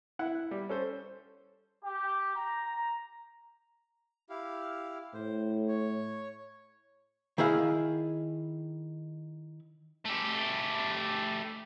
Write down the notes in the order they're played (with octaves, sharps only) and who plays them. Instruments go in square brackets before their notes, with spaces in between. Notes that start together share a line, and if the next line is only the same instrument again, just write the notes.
[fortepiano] E4 F#5
G3
C#4 A4 C5
[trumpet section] G4
A#5
[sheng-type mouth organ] E4 G4 F5
[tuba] A2 [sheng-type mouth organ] C5
[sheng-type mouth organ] C#5
[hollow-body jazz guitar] D#3 E4 G#4 F5
[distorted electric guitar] A3 G4